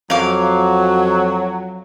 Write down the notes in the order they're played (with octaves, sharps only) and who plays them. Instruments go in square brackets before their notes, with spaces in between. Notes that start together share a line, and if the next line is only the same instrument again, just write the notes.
[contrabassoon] F2 [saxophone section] F#3 [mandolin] F5 D6